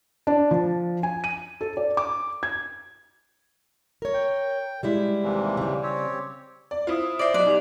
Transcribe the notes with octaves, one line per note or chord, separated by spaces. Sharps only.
D4
F3
G#5
D#7
A4
D5
D6
G#6
A#4 C#5
G5
G3 G#3 E4
D#2 C3 E3
C#3 G3
C4 G4 C#5
D5
E4 F4 C5 F5 D#6
C5 D5 E5 A#6 D7
B1 D5 D#5 F#6
D#4 G4 F7